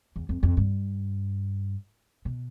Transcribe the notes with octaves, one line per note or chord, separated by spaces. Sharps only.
E2
F2
F2
G2
B2